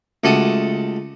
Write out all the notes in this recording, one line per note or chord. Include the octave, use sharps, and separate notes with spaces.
C#2 A3 F#4 A4 A5 D#6